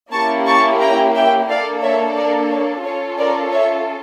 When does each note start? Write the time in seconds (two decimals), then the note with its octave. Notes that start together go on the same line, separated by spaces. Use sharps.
0.12 A#3 C#4 E4 G4 A5 C#6
0.46 A5 C#6
0.80 G5 A#5
1.15 E5 G5
1.49 A#3 D4 A4 D5 F5
1.82 C#5 E5
2.17 A#4 D5
2.50 C#5
2.84 C#4 F4 A4 C#5
3.18 A#4 D5
3.52 C#5 E5